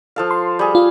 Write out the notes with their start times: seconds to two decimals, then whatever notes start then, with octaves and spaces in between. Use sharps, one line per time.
0.16 F3 A4 F5
0.31 C6
0.59 G3 G#4
0.75 F4